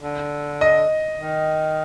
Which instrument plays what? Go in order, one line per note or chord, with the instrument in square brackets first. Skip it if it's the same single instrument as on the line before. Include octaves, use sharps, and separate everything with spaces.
[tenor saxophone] D3
[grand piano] D#5
[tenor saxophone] D#3